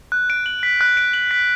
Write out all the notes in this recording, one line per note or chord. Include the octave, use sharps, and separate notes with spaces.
F#6
D7
F#7
B6
F#6
D7
F#7
B6